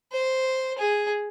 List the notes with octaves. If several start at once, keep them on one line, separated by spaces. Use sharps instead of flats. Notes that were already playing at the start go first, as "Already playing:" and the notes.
C5
G#4